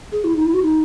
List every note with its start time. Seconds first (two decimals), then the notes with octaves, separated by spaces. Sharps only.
0.12 G#4
0.24 E4
0.36 D#4
0.45 E4
0.54 F#4
0.63 D#4